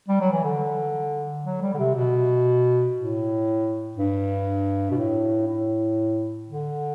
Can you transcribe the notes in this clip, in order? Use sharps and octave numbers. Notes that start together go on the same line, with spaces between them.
G3
F#3
E3
D3
F#3
G3
D3
C3
B2
A2
G2
B2
A2
A2
D3